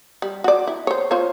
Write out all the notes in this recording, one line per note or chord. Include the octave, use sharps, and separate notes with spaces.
G3
F#4 D5
E4
C5 C#5
F4 C5 C#5